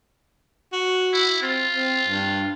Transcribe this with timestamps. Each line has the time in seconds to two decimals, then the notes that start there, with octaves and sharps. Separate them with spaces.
0.73 F#4
1.13 E4
1.42 C4 F4
1.73 C4
2.08 G2